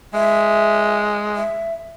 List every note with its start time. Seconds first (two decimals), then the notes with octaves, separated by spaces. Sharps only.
0.14 G#3 E5
1.35 E5